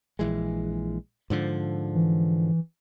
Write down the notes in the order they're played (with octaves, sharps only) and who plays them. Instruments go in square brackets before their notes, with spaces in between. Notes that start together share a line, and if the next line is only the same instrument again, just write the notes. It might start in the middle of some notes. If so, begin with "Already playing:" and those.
[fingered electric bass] A#1 E3 G#3
G#2 D3 F3
[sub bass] E3